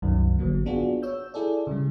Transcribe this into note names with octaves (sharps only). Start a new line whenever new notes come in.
C2 F#2 D#3 F#3
G#1 D3 F#3 A#3
B3 D4 F4 F#4 G#4
C#5 E6 G6
E4 G#4 A4 D5
C#3 G3